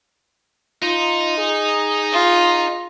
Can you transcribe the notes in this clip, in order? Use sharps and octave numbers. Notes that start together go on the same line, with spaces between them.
D#4 F4
G#4
F4